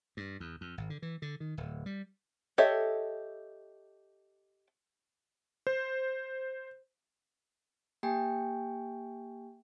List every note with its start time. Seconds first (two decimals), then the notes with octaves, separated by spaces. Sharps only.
0.17 G2
0.40 E2
0.61 F2
0.78 G#1
0.90 D3
1.02 E3
1.22 D3
1.40 D#3
1.57 D1
1.86 G3
2.58 G4 A4 C#5 D#5 E5
5.67 C5
8.03 A#3 G4 G5 G#5